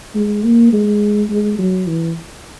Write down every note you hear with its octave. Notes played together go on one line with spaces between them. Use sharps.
G#3
A#3
G#3
G#3
F#3
E3